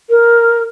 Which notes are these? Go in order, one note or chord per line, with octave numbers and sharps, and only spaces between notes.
A#4